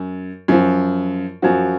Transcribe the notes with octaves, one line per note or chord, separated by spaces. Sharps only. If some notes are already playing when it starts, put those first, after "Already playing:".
Already playing: F#2
F#2 F3
F#2 F3 F#4